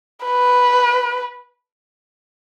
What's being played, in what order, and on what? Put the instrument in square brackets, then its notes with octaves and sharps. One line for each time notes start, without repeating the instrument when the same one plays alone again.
[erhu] B4